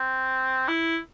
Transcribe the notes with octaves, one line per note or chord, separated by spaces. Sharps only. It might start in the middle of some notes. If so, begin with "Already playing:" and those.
Already playing: C4
E4